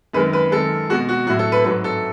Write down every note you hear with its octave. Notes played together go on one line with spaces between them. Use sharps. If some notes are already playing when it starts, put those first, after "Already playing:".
F#2 D#3 G#3 B4
B4
F#2 D#3 G#3 A4
B2 G#3 F#4
F#4
A2 F#3 F#4
A4
B4
G#2 F#3 B4
A4